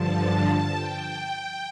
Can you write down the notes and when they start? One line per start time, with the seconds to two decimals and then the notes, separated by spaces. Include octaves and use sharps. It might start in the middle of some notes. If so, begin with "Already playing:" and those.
Already playing: G2 D3 F3 A5
0.72 G5